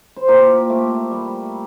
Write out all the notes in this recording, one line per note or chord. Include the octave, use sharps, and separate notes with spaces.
C5
A#2 G4 A#4
A3
G3